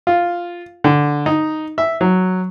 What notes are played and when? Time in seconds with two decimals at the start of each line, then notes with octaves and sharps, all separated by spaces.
0.07 F4
0.84 D3
1.26 D#4
1.78 E5
2.01 F#3